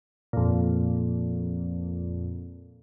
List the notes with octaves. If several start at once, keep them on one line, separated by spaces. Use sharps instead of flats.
F2 A#2